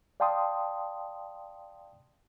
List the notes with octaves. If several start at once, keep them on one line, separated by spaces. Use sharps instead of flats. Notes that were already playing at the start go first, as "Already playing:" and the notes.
D5 F5 G5 A5 C6 D#6